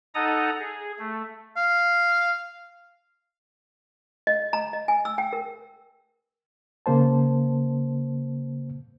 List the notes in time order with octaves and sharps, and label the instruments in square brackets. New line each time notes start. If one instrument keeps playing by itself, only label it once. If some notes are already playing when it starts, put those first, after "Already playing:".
[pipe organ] D#4 A4 D#5 F#5 A#5 D#6
G#4
A3
[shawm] F5
[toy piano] D#5
A#5
D#5
G#5
E6
G5
A#4
[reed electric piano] C#3 A#3 C5 A5